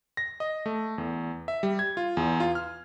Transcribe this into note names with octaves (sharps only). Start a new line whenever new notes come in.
A#6
D#5
A3
E2
E5
G3
G#6
F4
E2
F4
F6